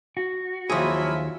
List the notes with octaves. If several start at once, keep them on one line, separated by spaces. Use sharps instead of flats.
F#4
D#2 F3 F#3 E4 F4 G#4 E5 B5